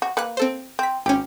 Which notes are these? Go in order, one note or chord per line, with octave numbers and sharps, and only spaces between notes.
F#4
A#3 B4 F#6 C#7
C4 A4 C5
C4 G6 B6
G#1 C#4 G4